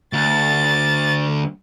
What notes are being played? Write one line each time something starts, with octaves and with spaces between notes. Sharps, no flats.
D2 A6